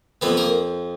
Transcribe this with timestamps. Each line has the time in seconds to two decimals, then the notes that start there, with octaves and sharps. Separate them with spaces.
0.22 F2 F3 A#3 B3 B4
0.37 A#3 A#4